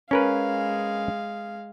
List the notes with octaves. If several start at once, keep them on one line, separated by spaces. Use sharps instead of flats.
G#3 C#4 A#4 B4 F5